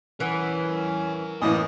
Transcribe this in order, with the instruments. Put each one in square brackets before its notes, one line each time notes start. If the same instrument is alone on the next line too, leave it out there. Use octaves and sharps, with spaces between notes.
[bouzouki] E3 [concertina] C#4 [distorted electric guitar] A#4 F#5
[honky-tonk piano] F#2 A2 E3 [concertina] A#3 D#5 D#6